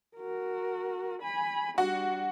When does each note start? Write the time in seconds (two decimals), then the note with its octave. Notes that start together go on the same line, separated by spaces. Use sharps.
0.16 F#4 A#4
1.22 G#5 B5
1.78 G3 D4 F#4